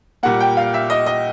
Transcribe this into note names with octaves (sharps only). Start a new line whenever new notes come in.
A#2 G3 A#3 F#5
G5
F5
E5
D#5
D#5